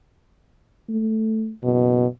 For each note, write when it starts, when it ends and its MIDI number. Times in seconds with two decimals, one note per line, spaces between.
0.89 1.52 57
1.64 2.05 30
1.64 2.06 47